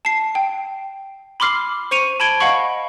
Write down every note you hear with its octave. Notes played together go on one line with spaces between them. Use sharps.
A5 C7
G5
B5 C6 D6 F6 C7
C5 C#6 C#7 D#7 F7
A5 B5 G#6 D7 G7
D#5 F5 F#5 B5 C#6